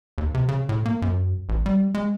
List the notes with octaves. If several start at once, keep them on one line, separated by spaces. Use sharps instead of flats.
D#2
C3
C#3
A2
A#3
F#2
A1
G3
G#3